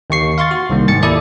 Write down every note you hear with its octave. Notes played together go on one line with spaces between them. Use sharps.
D#2 A#3 C#6 C7
F5 C6 C#6 A6
F#4
C2 D#3 A#3
G#2 D#3 A6 C#7
D#2 E4 A4 D5 D#6